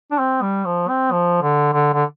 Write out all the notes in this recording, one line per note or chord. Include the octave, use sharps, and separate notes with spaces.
D4
C4
G3
F3
C4
F3
D3
D3
D3